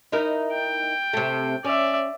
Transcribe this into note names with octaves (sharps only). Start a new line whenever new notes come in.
D#4 E4 A#4
G5
C3 A3
C#4 D5 E5